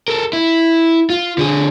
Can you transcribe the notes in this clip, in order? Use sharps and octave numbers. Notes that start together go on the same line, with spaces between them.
A4 A#4
E4
F4
D3 G#4